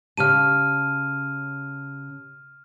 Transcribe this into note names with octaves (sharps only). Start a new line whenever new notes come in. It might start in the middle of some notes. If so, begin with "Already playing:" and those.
C#3 G4 A5 F6 D#7